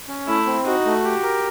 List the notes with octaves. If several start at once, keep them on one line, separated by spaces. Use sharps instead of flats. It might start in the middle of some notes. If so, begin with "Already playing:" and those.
C#4
A3 E4
C4
D#4 F#4
A3
G4
A#4